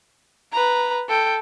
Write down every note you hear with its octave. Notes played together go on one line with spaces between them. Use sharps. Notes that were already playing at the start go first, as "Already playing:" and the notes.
B4 A#5
A4 G5